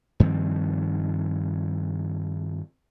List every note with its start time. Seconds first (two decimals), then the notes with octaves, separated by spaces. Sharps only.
0.20 G2 D#3 F3 C4